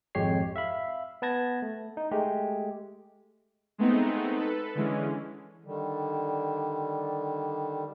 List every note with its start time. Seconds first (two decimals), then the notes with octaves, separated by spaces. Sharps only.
0.15 G#1 F2 G#3 G4 C#5 C7
0.56 E5 F5 B5
1.22 B3 B4 A5 G#6 A#6
1.62 A3
1.97 D#4
2.11 G#3 A3 G4
3.78 G#3 A3 B3 C4 D#4
4.36 A4 B4
4.75 D3 E3 G#3 C#4
5.65 D3 D#3 G3